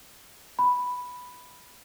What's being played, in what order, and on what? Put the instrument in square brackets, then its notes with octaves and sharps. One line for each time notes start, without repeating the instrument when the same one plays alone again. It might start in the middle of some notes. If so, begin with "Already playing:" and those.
[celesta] B5